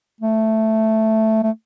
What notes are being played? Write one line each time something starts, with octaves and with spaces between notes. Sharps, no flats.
A3
A3